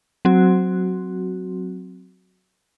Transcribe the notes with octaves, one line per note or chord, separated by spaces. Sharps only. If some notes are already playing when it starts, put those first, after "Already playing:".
F#3 C4 F#4